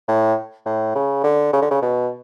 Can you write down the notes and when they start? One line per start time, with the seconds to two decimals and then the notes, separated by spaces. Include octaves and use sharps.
0.08 A2
0.66 A2
0.95 C#3
1.24 D3
1.53 C#3
1.62 D3
1.71 C#3
1.82 B2